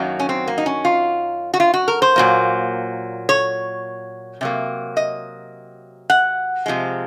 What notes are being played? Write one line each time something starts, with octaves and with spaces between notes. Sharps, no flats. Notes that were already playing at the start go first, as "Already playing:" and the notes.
Already playing: F#2 D#3 F#3 A#3
C#4
C4
A#3
D#4
C#4
F4
F#4
F4
F#4
A#4
C5
A#2 F#3 A#3
C#5
C3 F#3 A#3
D#5
F#5
C3 F3 G#3